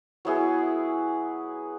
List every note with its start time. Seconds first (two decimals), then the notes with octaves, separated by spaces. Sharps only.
0.25 F#3 B3 E4 G#4